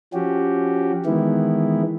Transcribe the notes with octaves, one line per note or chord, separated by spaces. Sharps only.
F3 C#4 F#4 G4
D#3 E3 G#3 B3 E4